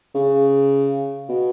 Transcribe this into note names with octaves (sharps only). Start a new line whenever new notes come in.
C#3
B2